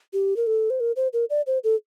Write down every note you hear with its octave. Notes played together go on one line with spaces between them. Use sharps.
G4
A#4
A4
C5
A#4
C5
A#4
D5
C5
A4